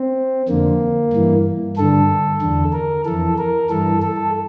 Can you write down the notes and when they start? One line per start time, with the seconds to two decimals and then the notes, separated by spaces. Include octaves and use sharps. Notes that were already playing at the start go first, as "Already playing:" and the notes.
Already playing: C4
0.48 F2 D3 A#3
1.14 G2 E3
1.77 G2 D3 A4
2.42 E2 D3
2.73 A#4
3.05 F2 E3 A4
3.38 A#4
3.70 G2 E3 A4
4.02 A4